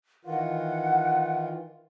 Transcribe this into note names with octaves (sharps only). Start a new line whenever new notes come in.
D#3 E3 F4 F#5